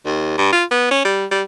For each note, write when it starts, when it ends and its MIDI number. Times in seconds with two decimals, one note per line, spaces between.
0.05 0.35 39
0.38 0.52 43
0.52 0.64 65
0.71 0.89 59
0.91 1.01 61
1.05 1.25 55
1.31 1.42 55